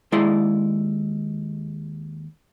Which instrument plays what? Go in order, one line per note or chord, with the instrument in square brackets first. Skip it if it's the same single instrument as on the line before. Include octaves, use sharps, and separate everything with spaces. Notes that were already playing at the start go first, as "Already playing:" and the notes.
[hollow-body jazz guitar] D#2 G#3 E4 G#4 D5 C6